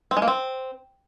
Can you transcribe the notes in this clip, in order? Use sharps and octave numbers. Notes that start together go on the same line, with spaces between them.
C4
G#3
A#3
C4